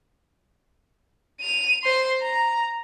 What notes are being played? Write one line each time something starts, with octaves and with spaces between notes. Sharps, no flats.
D#7 F7
C5 C6
A#5